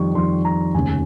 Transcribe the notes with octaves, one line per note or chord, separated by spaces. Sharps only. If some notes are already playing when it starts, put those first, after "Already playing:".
Already playing: F2 D#3 G3 C#6
F2 D#3 G3 C6
A#5
F1 D#2 C#3 G#5